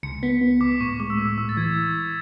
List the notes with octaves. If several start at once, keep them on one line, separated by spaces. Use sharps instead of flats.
C#2 C#7
B3 B6
B3
C#2 D6
A2 C#6
G#3 D6
E6
A2 D6
A2 E6
A6
E3 G#6